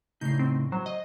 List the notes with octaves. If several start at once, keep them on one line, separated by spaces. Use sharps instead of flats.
A2 C#3 D#4 G6 C7
C4
F#3 C5
D#5